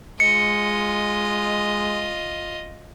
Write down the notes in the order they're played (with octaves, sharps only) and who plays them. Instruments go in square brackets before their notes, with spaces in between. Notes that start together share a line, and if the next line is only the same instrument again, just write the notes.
[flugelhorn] G#3 [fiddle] F4 D#5 [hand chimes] C#7